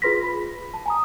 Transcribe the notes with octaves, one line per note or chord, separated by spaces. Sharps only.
F4 G#4 B4 C6 A#6 B6
B5
A5
G#5 A#5 D#6